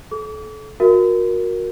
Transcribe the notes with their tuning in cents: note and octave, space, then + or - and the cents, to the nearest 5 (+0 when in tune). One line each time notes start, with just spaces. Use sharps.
A4 -35 D6 -40
F#4 -20 A#4 +0 E5 +0